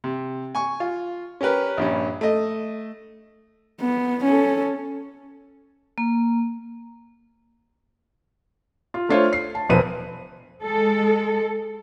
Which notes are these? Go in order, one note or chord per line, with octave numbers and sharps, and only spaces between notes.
C3
G#5 C#6
F4
C#4 G4 A#4 B4
A#1 G2 C#4
A3 D#5
B3
C#4 A4
A#3
F4
A3 D4 F4 C5 C#5
C7
A5
E1 F3 B4 C5 D#7
G#3 A4